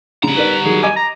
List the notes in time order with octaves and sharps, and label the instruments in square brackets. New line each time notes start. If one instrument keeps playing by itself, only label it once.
[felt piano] C#3 [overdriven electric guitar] G3 A#5
[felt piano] D#4 A#4 D5 [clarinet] B4
[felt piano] D#3 F#3 [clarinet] G#4
[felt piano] D#5 D6 [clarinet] G#5
[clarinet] A#5